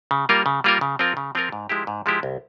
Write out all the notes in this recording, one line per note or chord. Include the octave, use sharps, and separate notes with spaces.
C#3
G3 A#3 F4 A#4
C#3
G3 A#3 F4 A#4
C#3
F3 C4 F4 A#4
C#3
F3 C4 F4 A#4
G#2
F3 G#3 E4 G4
G#2
F3 G#3 E4 G4
C2